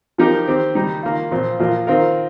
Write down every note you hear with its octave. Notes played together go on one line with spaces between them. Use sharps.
F3 D#4 G4 A#4
D#3 C4 G4
D#3 G3 D#4
D#3 A#3 F4
A#2 F3 C4 F4
A#2 F3 A#3 F4 A#4
D#3 C4 F4 A#4